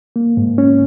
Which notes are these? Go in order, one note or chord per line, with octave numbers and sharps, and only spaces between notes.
A#3
G#2
C#4